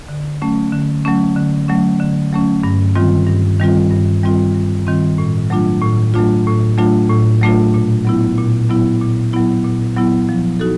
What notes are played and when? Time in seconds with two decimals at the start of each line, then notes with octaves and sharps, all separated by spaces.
0.09 D3
0.41 F#3 A3 C#4
0.73 D3
1.05 F#3 A3 C#4
1.36 D3
1.68 F#3 A3 C#4
2.00 D3
2.32 F#3 A3 C#4
2.63 G2
2.96 D#3 G3 C4 F4
3.27 G2
3.60 D#3 G3 C4 F4
3.91 G2
4.23 D#3 G3 C4 F4
4.55 G2
4.87 D#3 G3 C4 F4
5.18 A2
5.50 F#3 A3 D4 F4
5.82 A2
6.14 F#3 A3 D4 F4
6.47 A2
6.78 F#3 A3 D4 F4
7.09 A2
7.41 F#3 A3 D4 F4
7.74 A#2
8.05 F#3 B3 E4
8.38 A#2
8.70 F#3 B3 E4
9.01 A#2
9.33 F#3 B3 E4
9.64 A#2
9.96 F#3 B3 E4
10.29 F3
10.60 D#4 F#4 A4